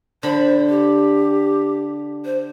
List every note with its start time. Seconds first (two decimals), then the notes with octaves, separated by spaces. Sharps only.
0.23 D3 C5 B5
0.69 G4
2.25 C5